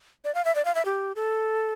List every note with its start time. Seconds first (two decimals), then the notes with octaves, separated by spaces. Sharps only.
0.24 D5
0.35 F5
0.45 E5
0.55 D5
0.65 F5
0.75 E5
0.85 G4
1.16 A4